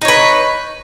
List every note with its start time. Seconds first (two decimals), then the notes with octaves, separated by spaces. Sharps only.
0.02 D#4
0.05 C#5
0.08 B4